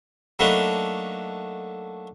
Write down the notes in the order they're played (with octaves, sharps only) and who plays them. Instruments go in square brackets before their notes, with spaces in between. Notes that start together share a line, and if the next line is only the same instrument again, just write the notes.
[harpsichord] F#3 A3 A#3 D4 D#4 B4